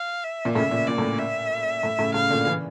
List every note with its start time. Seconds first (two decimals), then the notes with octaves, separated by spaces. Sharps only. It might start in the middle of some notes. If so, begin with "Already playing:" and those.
Already playing: F5
0.24 E5
0.45 A#2
0.55 A2 C#3 E5
0.71 A#2
0.87 A#2 D5
0.98 A2
1.19 E5
1.83 A2
1.99 A2 C#3
2.14 A2 C#3 F5
2.30 A#2 D3
2.46 C#3 E3